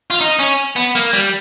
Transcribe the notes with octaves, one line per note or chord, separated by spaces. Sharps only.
F4
D#4
C#4
B3
A#3
G3